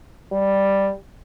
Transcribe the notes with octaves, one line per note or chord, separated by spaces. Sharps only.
G3